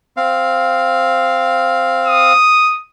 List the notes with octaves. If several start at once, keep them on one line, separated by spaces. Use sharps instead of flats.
C4 F5
D#6